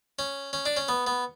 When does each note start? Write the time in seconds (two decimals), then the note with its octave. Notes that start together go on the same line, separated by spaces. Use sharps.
0.19 C#4
0.53 C#4
0.66 D4
0.77 C#4
0.88 B3
1.07 B3